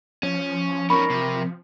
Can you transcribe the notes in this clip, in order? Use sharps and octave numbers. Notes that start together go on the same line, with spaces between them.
F3 C#4
C#4 D#4 A#4 B5 C#6
C3 F3